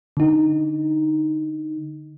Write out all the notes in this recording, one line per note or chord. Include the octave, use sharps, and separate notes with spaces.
D3 D#4